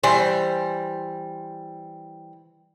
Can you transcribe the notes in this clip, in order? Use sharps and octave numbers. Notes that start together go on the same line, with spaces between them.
E3 G3 C5